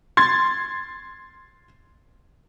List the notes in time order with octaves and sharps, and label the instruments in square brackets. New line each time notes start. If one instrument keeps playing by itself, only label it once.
[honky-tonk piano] C6 G#6 A6